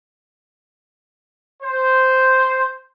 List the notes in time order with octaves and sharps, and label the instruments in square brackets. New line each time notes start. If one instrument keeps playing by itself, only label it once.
[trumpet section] C5